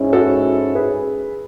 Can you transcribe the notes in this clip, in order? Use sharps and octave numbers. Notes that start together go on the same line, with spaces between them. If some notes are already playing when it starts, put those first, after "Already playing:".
Already playing: G#2 G#3 C#4 E4
F#4 A4
G#4 B4